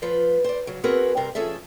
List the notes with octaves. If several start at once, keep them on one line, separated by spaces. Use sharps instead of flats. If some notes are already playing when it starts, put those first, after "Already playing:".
F3 F4 B4 C5
C5 D5
C#3 F#3
B3 C4 F#4 G#4 A#4 B4
G2 C3 A#4 C5
F3 C#4 G#4 A4 E5